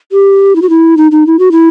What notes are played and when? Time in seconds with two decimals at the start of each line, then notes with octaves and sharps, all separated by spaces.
0.12 G4
0.56 E4
0.62 F#4
0.69 E4
0.97 D#4
1.11 D#4
1.26 E4
1.39 F#4
1.52 E4